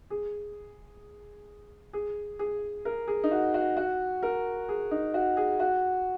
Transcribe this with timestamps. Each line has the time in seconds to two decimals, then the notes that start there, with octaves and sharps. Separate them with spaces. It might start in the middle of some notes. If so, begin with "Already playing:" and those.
0.10 G#4
1.93 G#4
2.39 G#4
2.85 A#4
3.08 G#4
3.24 D#4
3.31 F#4
3.54 F#4
3.77 F#4
4.23 A#4
4.69 G#4
4.91 D#4
5.14 F#4
5.37 G#4
5.60 F#4